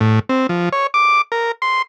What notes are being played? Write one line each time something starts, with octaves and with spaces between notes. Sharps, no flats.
A2
C4
F3
C#5
D6
A#4
C6